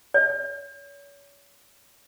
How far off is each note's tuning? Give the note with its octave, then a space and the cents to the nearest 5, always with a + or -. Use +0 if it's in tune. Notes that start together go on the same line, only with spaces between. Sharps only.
C#5 +35